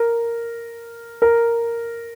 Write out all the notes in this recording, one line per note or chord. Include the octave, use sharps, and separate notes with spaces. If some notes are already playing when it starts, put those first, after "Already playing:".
Already playing: A#4
A#4